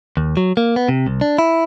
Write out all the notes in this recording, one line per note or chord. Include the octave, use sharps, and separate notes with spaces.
D#2
F#3
A#3
B3
C3
C2
D4
E4